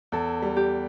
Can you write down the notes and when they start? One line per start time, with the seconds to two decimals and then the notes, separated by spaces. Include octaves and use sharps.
0.12 E2 A4
0.42 G3
0.56 G4